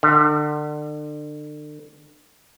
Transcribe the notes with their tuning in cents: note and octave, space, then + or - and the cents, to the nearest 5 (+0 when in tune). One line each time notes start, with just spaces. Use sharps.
D3 +35